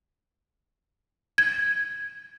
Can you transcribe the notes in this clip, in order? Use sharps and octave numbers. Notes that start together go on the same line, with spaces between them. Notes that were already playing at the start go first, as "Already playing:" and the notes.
G#6